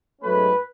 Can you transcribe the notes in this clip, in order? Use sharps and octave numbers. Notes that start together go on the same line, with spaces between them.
G#2 F#3 A3 C#4 B4